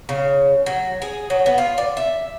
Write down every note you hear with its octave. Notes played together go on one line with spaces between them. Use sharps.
C#3
F#3
G#4
F#3
B3
F4
D5
E5